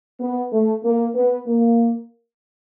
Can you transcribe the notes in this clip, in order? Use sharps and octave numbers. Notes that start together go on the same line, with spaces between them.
B3
A3
A#3
B3
A#3